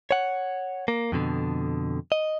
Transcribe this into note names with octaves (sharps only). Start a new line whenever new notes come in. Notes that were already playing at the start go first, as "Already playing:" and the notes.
C#5 F#5
A#3
F2 B2 D3
D#5